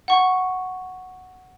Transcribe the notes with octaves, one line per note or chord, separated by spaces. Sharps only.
F#5 C#6